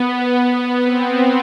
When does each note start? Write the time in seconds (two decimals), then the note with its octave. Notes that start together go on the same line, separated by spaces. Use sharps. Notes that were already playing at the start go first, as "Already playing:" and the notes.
Already playing: B3
0.39 B3
0.82 C4